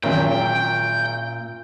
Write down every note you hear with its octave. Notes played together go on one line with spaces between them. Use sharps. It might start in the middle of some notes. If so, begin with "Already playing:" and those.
G#1 F#2 A#2 G5